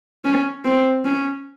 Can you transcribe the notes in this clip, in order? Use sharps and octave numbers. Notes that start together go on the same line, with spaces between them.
C#4
C4
C#4